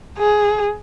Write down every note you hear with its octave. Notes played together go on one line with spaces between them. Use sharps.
G#4